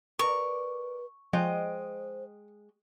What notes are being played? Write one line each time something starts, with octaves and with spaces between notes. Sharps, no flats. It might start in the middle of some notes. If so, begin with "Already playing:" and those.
A#4 B4 D5 C#6
F3 G#3 C5 D#5 G5